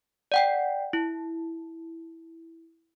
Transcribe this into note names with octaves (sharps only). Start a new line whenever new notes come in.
D5 F#5 G5
E4